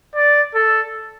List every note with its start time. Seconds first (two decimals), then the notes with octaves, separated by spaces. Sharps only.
0.15 D5
0.55 A4